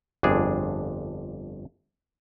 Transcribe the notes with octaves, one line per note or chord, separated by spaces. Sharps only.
G1 F2 D4 G#4